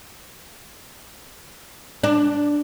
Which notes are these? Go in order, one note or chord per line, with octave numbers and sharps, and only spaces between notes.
D4